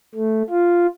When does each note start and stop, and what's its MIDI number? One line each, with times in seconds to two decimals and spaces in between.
0.15 0.43 57
0.50 0.87 65